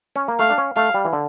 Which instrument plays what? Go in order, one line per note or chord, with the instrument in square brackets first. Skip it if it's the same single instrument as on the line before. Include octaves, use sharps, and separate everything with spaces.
[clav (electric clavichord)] C#4
A#3
[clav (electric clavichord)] A3 [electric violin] F5
[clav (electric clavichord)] D4
C#4
[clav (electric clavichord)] A3 [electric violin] F5
[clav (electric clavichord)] G3
E3
D3